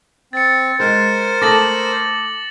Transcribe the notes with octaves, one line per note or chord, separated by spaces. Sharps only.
C4 A6 C#7
G#3 A#4 C5
A3 A4 D6 D#6 A#6 F#7